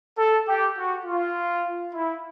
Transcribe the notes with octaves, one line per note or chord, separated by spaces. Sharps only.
A4
G4
F#4
F4
E4